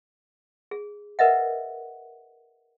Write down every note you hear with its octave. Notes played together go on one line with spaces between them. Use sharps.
G#4
A#4 B4 D#5 E5 F#5